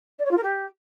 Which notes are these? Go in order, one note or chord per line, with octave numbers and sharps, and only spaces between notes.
D5
C#5
F4
A#4
G4